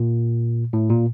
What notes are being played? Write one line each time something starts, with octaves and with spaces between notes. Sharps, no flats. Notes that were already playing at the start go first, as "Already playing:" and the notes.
Already playing: A#2
A2
A#2